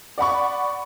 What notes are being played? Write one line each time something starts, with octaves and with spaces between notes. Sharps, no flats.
D5 F#5 B5 C#6